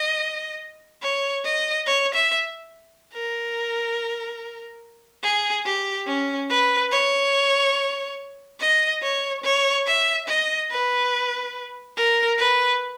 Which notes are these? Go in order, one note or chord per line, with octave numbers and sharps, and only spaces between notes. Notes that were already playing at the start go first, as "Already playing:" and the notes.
Already playing: D#5
C#5
D#5
C#5
E5
A#4
G#4
G4
C#4
B4
C#5
D#5
C#5
C#5
E5
D#5
B4
A#4
B4